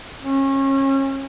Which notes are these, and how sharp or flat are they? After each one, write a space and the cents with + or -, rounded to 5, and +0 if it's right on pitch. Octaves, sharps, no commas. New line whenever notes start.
C#4 -30